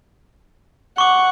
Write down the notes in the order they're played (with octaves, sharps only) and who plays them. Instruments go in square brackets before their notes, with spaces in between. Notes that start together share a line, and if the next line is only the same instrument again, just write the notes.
[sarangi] F#5 [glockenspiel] C#6 D6